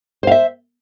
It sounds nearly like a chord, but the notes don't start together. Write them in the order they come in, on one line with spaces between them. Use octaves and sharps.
C5 F5 E5